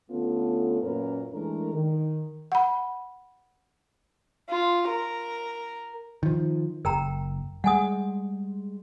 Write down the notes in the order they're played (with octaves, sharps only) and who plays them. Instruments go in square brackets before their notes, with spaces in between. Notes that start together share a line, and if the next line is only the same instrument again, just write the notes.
[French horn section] D3 A3 B3 C#4 F4 A4
F#2 A#2 A#3 C#4 A#4 B4
E3 G#3 A3 D4 A#4
D#3
[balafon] F#5 B5
[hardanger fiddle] F4
A#4
[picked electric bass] D#3 F3
[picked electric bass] F#1 [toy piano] A#4 G5 A#5
[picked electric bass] G3 G#3 [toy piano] F#5 G#5 D#6